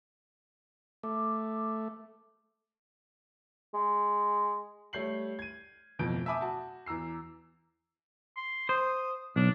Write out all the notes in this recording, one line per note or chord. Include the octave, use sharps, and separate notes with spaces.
A3 D6
G#3
G3 A3 C#5 G6 C7 F#7
G#6 D#7
D1 F2 B2 G6 D7
E5 G#5 A5 B5 D6 D#6
F#4 A5
E2 A#5 E6 C7
C6
C5 D#6
B1 D4